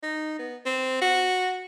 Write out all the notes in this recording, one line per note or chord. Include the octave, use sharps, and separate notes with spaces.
D#4
B3
C4
F#4